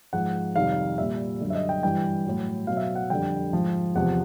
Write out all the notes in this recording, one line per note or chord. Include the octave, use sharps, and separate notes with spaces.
G#2 F3 F#5
F2 C3 D#3 G3 F5
A#2 G3 E5
F#2 D3 G3
E5
D#5
G5
G2 E3 G3 G5
A2 F#3
B2 F#3 F5
E5
F5
F#5
F2 D3 G3 G5
G#2 F3
E2 C3 F3 F#5